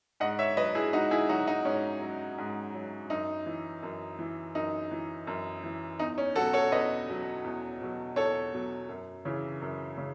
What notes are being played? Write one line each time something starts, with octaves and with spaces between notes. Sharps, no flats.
G#2 D#5 F#5
C#5 E5
F#3 B4 D#5
E4 G#4
G#2 D#4 F#4
E4 G#4
F#3 D#4 F#4
D#4
G#2 C#4
F#3
G#2
F#3
F#2 D#4
E3
F#2
E3
F#2 D#4
E3
F#2
E3
E2 D#4
C#4
B2 F#3 F#4 A4
A4 C#5
E2 B4 D#5
B2 F#3
E2
B2 F#3
E2 A4 C#5
B2 F#3
F#2
C#3 E3
F#2
C#3